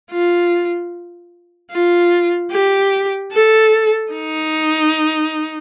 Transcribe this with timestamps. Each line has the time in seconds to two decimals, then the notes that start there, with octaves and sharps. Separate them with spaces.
0.11 F4
1.71 F4
2.52 G4
3.32 A4
4.12 D#4